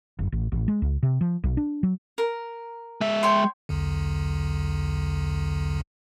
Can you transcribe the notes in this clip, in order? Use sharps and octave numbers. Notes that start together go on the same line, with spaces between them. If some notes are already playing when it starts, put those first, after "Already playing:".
F#1
A1
A1
G#3
C#2
C3
F3
B1
D4
F#3
A#4
G#3 E5
C#5 G5 C6
B1 E2 D3